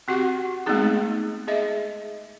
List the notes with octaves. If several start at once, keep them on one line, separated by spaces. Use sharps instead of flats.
C4 F#4 G4 F#5
G#3 A3 B3 C4 D#4 G#4
G#4 D#5 E5